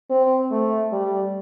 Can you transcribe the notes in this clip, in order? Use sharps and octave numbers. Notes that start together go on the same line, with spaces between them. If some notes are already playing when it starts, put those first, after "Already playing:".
C4
A3
G3